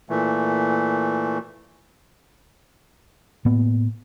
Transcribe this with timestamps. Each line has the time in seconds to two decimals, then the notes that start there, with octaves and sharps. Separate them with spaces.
0.10 A#2 E3 A3
3.45 A2 A#3 B3